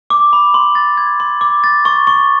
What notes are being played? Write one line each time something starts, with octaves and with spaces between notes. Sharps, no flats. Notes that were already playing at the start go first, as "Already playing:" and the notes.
D6
B5
C6
A6
G#6
C6
D6
A6
C#6
C#6